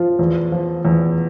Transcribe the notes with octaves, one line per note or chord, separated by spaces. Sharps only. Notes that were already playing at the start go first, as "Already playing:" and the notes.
Already playing: F3 F4
E2
F3
E2